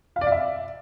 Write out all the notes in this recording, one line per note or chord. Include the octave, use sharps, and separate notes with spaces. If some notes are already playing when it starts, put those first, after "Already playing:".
F5
D5
F5
E5